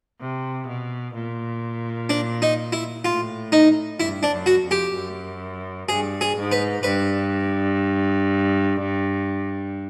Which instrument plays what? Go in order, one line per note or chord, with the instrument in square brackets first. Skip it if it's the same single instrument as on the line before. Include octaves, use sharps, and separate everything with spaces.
[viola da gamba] C3
B2
A#2
[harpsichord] D4
D#4
E4
[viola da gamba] A2 [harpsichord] F4
[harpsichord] D#4
[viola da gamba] G2 [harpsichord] E4
[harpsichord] D4
[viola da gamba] F#2
[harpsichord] F#4
[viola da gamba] F2
[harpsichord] G4
[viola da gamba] F#2
[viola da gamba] G2 [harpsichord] G#4
[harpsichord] G#4
[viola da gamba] G#2
[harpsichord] B4
[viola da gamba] G2 [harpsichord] B4